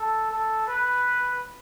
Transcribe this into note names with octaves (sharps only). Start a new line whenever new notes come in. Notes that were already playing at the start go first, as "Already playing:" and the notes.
Already playing: A4
A4
B4